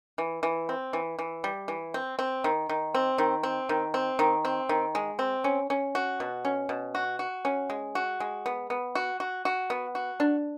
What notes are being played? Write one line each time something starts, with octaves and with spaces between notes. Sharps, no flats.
E3
E3
C4
E3
E3
G3
E3
C4
C4
D#3
D#3
C4
D#3
C4
D#3
C4
D#3
C4
D#3
G#3
C4
C#4
C#4
F#4
B2
C#4
B2
F#4
F#4
C#4
G#3
F#4
G#3
B3
B3
F#4
F#4
F#4
B3
F#4
D4